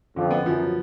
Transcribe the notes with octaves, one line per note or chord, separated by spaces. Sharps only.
F2 D3
B3
F#2 F3